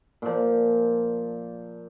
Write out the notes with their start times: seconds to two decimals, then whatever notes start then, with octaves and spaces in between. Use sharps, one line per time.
0.22 A#2 F3